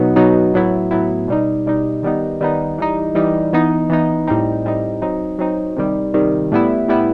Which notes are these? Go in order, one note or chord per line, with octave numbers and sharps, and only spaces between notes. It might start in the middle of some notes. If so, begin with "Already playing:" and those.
Already playing: B2 F#3 B3 D#4
B2 F#3 B3 D#4
A2 F#3 B3 E4
A2 F#3 B3 E4
B2 G3 D#4
B2 G3 D#4
D#3 G3 B3 D#4
D#3 G3 B3 D#4
E3 G3 D#4
E3 G3 D#4
E3 B3 D#4
E3 B3 D#4
A2 G3 C4 D#4
A2 G3 C4 D#4
F#3 C4 D#4
F#3 C4 D#4
C3 D#3 G3
C3 D#3 G3
A2 G3 B3 E4
A2 G3 B3 E4